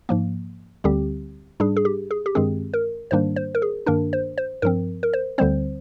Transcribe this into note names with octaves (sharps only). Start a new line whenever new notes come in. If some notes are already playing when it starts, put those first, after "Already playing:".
G#2 F3 A#3
D2 D3 G3 C4 G4
G#2 G3 D4 G#4
G#4
G4
G#4
G4
G2 D#3 G#3 C4 G#4
A#4
G#2 D#3 G3 A#3 D4 C5
C5
A#4
G#4
G2 D#3 A#3 D4 A#4
C5
C5
G2 F3 C4 A#4
A#4
C5
D2 D3 G3 C4 C5